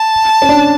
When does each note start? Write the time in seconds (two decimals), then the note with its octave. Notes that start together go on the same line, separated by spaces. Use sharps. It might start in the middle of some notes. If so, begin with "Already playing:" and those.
Already playing: A5
0.42 C#4
0.49 D4